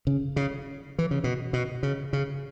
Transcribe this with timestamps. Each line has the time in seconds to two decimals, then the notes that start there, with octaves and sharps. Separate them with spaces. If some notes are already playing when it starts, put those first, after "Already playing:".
0.07 C#3
0.36 C#3
0.99 E3
1.11 C#3
1.24 B2
1.53 B2
1.83 C#3
2.13 C#3